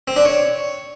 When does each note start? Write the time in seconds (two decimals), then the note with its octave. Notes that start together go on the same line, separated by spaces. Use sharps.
0.08 C4
0.16 D4
0.25 C#5